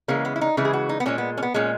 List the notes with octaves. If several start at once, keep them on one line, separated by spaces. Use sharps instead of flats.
C#3 E3 G#3 A#3
B3
E4
D#4
C#3 E3 G#3 E4
G#4
F#4
D#4
B3
A#2 G#3 C#4
B3
C#4
B3
A#2 G#3 C#4